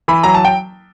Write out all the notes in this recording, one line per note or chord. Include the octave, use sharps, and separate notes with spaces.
E3 B5
F#3 A#5
A5
G5